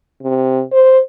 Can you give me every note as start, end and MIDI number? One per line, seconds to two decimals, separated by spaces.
0.23 0.63 48
0.72 0.99 72